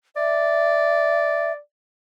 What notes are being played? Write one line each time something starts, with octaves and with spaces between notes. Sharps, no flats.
D5 E5